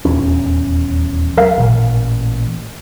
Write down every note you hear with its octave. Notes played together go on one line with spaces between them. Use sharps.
D#1 E2 C#4
F#3 A#4 E5 F5
A1 A#2